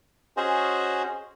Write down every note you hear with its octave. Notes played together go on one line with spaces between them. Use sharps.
C#4 F#4 G#4 C5 D#5